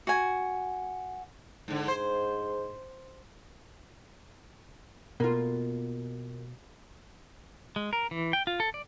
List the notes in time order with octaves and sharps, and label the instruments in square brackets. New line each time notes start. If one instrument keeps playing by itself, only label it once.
[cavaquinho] F#4 G#5
[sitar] G#2 D3
[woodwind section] G#2 [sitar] C5
[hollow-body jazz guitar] B2 [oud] A#3 F4
[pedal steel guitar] G#3
A#4
E3
G5
F4
A4
D5